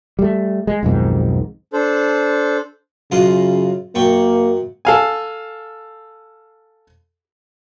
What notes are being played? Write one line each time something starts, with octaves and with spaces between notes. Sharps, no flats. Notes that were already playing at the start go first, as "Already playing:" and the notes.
G3 A3
G#3
B1 F2 G#2 D#3
D4 A4 C5
F#2 C#3 F4 D#5
F#2 A#3 G5 C#6
A4 F5 G#5